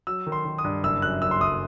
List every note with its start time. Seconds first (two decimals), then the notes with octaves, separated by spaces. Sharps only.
0.07 F#3 E6
0.27 D#3
0.32 C6
0.45 D#3
0.58 D#6
0.64 G2
0.83 F#1 E6
1.02 F#2 F#6
1.22 F#2 E6
1.31 C6
1.40 F#1 D#6